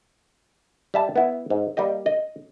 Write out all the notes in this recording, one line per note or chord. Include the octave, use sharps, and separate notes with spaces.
G3 E5 A5
B3 E4
G#2
G3 A#3 G4 D#5
D#5